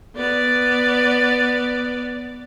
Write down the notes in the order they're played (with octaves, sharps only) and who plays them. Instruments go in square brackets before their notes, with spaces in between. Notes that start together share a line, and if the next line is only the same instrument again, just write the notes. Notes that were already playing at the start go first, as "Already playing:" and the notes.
[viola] B3 D5